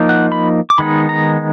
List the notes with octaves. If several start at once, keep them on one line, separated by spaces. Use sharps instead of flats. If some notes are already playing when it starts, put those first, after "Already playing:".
Already playing: F3 A#3 D#4
F#5
B5
D6
D#3 G#3 B3 D#4 B5
A#5